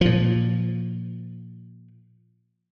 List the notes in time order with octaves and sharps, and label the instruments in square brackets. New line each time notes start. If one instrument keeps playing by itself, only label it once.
[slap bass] A#2 F3